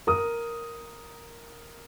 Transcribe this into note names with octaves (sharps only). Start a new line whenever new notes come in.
A#4 D#6